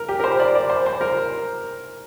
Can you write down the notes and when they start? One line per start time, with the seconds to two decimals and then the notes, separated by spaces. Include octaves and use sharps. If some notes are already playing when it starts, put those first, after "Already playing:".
Already playing: A#4
0.09 G4
0.20 A#4
0.24 C5
0.40 D5
0.55 D5
0.70 C5
0.86 C5
1.01 A#4